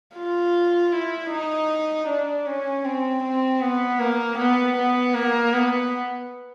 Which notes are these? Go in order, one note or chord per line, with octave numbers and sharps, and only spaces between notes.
F4
E4
D#4
D4
C#4
C4
C4
B3
A#3
B3
B3
A#3
B3